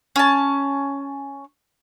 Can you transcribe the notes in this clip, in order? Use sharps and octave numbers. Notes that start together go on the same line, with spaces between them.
C#4 A5